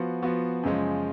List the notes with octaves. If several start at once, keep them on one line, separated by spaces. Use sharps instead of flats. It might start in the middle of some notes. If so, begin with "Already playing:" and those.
Already playing: F3 B3 F#4
F3 B3 F#4
F#2 C#3 F3 G#3 C#4